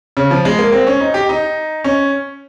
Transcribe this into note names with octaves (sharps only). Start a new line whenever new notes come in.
C#3
F3
G#3
A#3
C4
C#4
D#4
G4
D#4
C#4